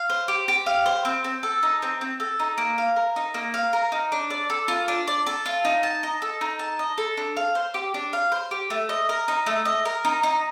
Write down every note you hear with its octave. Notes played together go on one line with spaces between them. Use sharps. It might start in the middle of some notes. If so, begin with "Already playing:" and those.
Already playing: F5
C5
G4
G4
F5
C5
C4
C4
A4
D#4
C4
C4
A4
D#4
A#3
F5
A#4
D#4
A#3
F5
A#4
D#4
D4
D5
A4
F4
D4
D5
A4
F4
D#4
A5
D#5
A4
D#4
A5
D#5
A4
D4
F5
C5
G4
D4
F5
C5
G4
A3
D#5
A#4
D#4
A3
D#5
A#4
D#4
D#4